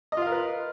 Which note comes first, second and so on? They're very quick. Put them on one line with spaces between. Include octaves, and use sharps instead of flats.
D#5 F4 F5 A#4 B4